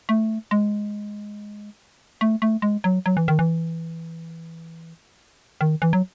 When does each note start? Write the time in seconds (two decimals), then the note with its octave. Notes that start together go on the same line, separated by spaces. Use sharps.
0.09 A3
0.51 G#3
2.21 A3
2.42 A3
2.62 G#3
2.84 F#3
3.06 F#3
3.17 E3
3.28 D#3
3.39 E3
5.61 D#3
5.82 E3
5.93 F#3